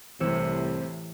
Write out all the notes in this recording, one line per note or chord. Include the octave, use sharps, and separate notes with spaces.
C2 A2 C3 E3 C4 E6 C#7